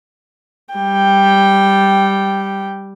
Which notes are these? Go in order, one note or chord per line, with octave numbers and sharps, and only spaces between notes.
G3 G5